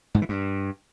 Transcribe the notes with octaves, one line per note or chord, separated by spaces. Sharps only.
G#2
E3
G2